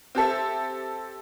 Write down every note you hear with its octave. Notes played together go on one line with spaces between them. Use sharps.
C4 G4 A4 E5